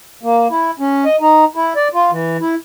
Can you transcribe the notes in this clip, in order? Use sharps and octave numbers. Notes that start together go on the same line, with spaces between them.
A#3
E4
C#4
D#5
D#4
E4
D5
F4
E3
E4